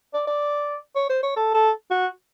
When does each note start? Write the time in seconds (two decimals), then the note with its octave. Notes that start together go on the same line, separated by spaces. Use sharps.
0.14 D5
0.28 D5
0.96 C#5
1.10 C5
1.23 C#5
1.36 A4
1.54 A4
1.91 F#4